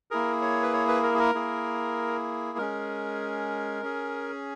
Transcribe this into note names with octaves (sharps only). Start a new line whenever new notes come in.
A#3 E4 G#4 A#4
C#5
B4
C#5
B4
A#4
G#4
A#4
A#3 E4 G#4
G#3 C#4 G#4 A#4
C#4 G#4